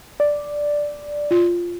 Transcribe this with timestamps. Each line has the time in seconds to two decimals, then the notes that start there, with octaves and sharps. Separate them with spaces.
0.20 D5
1.31 F4